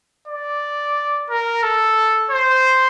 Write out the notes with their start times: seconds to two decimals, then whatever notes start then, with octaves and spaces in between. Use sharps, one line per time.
0.28 D5
1.30 A#4
1.63 A4
2.31 C5